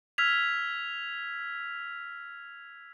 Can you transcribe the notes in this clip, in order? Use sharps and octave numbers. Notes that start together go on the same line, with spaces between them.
E6 F6 G#6 B6 F7